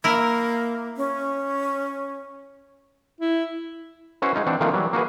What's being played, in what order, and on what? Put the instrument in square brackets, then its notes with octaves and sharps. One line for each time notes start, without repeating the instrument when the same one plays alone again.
[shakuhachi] A#3 [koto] E4 A#4
[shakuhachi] C#4
[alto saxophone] E4
[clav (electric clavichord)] C#4 E4 F#4 B4 C5
G#3 D#4 F4
E3 C4 D4 F#5
D#3 F3 A3 A#3 C4 D4
E3 F#3 G3
A#3 F#4 G#4 B4